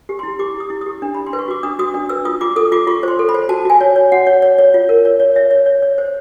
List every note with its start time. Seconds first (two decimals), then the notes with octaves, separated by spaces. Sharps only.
0.09 G4
0.19 E4 C6
0.39 G4 D6
0.54 E4
0.60 D#6
0.70 E4
0.81 G4 D#6
1.02 D4
1.14 D4 B5
1.26 C6
1.33 B4
1.39 C#6
1.48 F#4 D6
1.63 D4 D#6
1.79 F#4 D#6
1.94 D4 D#6
2.09 B4 E6
2.25 F4 D#6
2.41 F4 D6
2.56 A4 D#6
2.72 F4 D6
2.87 F4 C#6
3.03 C5 C6
3.19 A4
3.29 B5
3.34 C5
3.49 F#4 A5
3.65 F#4 G#5
3.81 C#5
3.96 C#5
4.12 F#4 F#5
4.27 C#5
4.42 C#5
4.58 C#5
4.74 F4
4.89 A#4
5.05 C#5
5.20 C#5
5.36 C#5 E5
5.51 C#5
5.66 C#5
5.82 C#5
5.98 C5